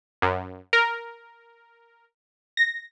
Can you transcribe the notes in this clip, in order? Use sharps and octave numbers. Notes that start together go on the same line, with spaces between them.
F#2
A#4
A#6